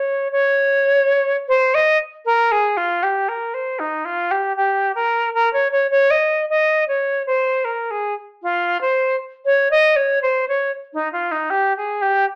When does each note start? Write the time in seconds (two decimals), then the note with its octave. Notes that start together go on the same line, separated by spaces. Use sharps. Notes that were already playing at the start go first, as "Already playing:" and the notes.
Already playing: C#5
0.32 C#5
1.48 C5
1.74 D#5
2.25 A#4
2.51 G#4
2.77 F4
3.03 G4
3.28 A#4
3.54 C5
3.79 D#4
4.05 F4
4.31 G4
4.56 G4
4.95 A#4
5.34 A#4
5.53 C#5
5.72 C#5
5.91 C#5
6.10 D#5
6.49 D#5
6.88 C#5
7.26 C5
7.64 A#4
7.90 G#4
8.42 F4
8.81 C5
9.45 C#5
9.70 D#5
9.96 C#5
10.22 C5
10.48 C#5
10.93 D#4
11.12 F4
11.31 D#4
11.50 G4
11.77 G#4
12.01 G4